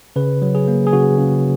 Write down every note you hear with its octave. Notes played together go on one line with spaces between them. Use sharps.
C#3 B4
F#3
G#4
A#3
G#4
C#3 F#4
C#3